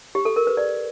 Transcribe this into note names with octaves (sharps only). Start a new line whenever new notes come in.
G4
A4
A#4
B4
D5